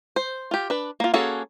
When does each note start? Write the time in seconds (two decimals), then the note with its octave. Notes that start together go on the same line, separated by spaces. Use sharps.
0.16 C5
0.51 F4 G4
0.70 D4 B4
1.00 A#3 F4
1.14 A#3 C#4 F#4 G#4 A4